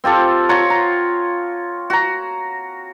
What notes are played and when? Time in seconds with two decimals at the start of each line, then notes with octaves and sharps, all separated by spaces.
0.04 C4 F4 G4 A4
0.49 F4 C#5 F#5 A#5
0.70 A#5
1.90 F#4 A#5